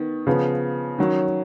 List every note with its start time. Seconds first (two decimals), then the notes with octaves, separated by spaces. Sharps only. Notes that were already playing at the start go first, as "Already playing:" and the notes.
Already playing: D#3 B3
0.27 C#3 F3 B3
0.98 D#3 F#3 C#4